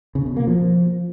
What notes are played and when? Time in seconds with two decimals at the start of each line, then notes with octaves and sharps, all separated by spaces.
0.15 C#3
0.26 B2
0.37 A#3
0.47 F3